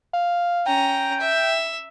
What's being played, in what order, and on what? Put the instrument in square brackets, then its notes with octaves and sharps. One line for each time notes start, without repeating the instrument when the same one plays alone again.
[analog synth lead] F5
[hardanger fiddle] C#4 A#5 [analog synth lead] G5
[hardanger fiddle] E5